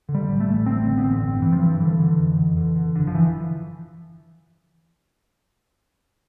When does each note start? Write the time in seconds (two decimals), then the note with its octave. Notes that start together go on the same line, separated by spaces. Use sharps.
0.09 D3
0.14 G3
0.28 A1
0.40 A3
0.47 A1
0.65 A1 C4
0.85 D3
0.98 B3
1.04 A1 C4
1.23 G2
1.42 G2 E3
1.53 F3
1.61 G2 E3
1.80 D3 E3
1.99 D3
2.19 F2
2.37 F2
2.57 D3
2.75 D3
2.95 G1 D3
3.07 F3
3.15 E3